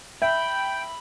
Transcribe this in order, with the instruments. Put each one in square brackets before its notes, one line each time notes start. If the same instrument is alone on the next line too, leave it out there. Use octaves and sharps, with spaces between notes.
[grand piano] E5 [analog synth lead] G5 [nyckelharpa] B5